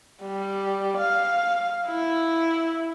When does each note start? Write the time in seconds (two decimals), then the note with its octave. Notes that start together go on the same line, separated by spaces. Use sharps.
0.22 G3
0.97 F5
1.87 E4